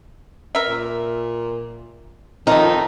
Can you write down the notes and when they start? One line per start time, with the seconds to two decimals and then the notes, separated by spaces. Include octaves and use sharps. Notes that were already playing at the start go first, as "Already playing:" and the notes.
0.55 A#4 E5
0.67 A#2
2.47 F2 D#3 F3 A3 D#4 A#4